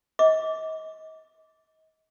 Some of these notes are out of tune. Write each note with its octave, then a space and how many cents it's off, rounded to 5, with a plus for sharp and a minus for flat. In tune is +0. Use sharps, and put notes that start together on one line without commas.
D#5 +30 D6 -20